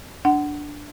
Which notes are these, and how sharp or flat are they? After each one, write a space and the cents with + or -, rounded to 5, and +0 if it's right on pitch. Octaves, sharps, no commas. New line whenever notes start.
D4 +0 F#5 +20